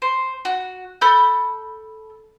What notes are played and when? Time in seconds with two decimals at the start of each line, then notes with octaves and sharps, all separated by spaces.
0.02 C5
0.45 F#4
1.01 A4 B5 G6